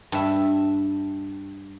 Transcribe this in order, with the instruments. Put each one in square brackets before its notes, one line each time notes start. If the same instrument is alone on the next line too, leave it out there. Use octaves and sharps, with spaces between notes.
[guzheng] G2 E5